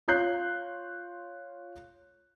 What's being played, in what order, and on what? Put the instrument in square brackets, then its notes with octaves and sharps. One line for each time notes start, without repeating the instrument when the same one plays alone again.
[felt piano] F4 C#5 F#6 G6 C7